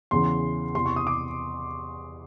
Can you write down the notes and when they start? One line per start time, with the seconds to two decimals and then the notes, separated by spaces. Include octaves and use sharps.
0.11 E2 C#3 E3 C6
0.75 E2 C3 E3 C6
0.86 C#6
0.96 D#6
1.07 D6